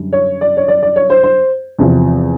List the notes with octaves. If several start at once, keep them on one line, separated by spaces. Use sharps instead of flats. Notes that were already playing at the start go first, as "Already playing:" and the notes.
Already playing: F#2 D3 G3
C#5
D5
C#5
D5
D5
C#5
C5
C5
E2 C3 F3